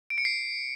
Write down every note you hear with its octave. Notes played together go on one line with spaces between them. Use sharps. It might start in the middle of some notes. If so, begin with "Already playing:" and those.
D7
C#7
C7